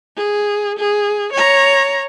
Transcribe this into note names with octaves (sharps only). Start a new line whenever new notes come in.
G#4
G#4
C#5 A#5